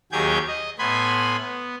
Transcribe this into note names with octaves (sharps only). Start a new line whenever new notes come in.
D#2 F#3 G4 G#4 G6 G#6
D#5
A2 B3 G#5 B5 C6
B3